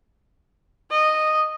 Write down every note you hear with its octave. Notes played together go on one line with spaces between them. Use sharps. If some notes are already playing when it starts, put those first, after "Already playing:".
D#5